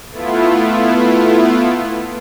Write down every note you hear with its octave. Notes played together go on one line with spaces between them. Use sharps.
A3 B3 E4 F4